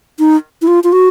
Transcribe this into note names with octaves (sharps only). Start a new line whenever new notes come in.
D#4
E4
F4
F4
F#4